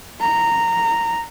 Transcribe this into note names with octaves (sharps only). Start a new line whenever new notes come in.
A#5